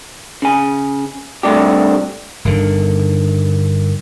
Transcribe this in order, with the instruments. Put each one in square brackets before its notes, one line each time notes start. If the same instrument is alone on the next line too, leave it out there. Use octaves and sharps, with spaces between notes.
[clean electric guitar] C#3 G#5
G2 C3 A3 D4 G4
[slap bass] G1 D3 D#3